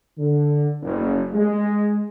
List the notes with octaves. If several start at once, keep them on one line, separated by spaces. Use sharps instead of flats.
D3
F#1
G#3